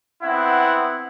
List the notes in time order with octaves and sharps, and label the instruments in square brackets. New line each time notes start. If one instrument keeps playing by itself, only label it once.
[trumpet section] B3 C4 E4 F#5